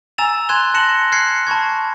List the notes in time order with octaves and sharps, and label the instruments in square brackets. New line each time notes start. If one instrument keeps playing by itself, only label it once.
[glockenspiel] G#5 A#5 E6 A6 E7 F7
G#5 C6 F#6 G#6 E7 G7
A5 F#6 A#6 C#7 E7 F#7
F6 F#6 G#6 C7 C#7
A5 B5 C#6 G#6